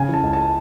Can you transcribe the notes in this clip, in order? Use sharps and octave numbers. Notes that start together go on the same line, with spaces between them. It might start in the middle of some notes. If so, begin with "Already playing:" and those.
Already playing: C#3 G#5
E3
A5
C#2
A5